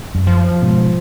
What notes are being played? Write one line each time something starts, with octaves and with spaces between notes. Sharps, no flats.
F#2
F3
G#2 B2